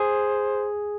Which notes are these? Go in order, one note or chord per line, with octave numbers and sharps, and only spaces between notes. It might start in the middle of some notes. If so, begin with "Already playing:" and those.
Already playing: G#4 C5